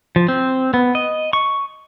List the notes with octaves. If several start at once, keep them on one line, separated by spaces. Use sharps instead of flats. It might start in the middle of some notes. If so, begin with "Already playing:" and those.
F3
C4
B3
D#5
C#6